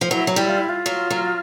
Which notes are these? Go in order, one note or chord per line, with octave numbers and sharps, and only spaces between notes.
F3
F#3 E4
F#3
G3 E4
F4
E4
F4
F#3
F#3